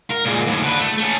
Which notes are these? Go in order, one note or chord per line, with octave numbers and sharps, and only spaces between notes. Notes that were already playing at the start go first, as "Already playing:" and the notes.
A#4
A#2 G#3
D#2 A2
D3 B4
A3
A3 C#4